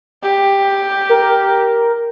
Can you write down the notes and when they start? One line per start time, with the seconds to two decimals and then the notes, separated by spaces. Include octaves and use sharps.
0.23 G4
1.09 A#4